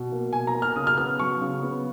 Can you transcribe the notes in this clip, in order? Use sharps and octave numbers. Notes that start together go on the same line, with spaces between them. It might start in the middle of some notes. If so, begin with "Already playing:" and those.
Already playing: B2
A#3
B2 G#5
A#5
A#3
F6
C#3 D#6
F6
B3 F6
F#3 C#6
C#3
B3